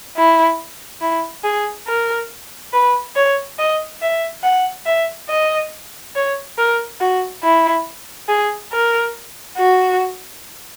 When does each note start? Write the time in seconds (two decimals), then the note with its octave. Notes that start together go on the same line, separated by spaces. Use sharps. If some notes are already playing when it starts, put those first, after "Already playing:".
0.17 E4
1.01 E4
1.44 G#4
1.87 A#4
2.73 B4
3.16 C#5
3.59 D#5
4.02 E5
4.43 F#5
4.86 E5
5.29 D#5
6.15 C#5
6.58 A#4
7.01 F#4
7.43 E4
8.29 G#4
8.72 A#4
9.58 F#4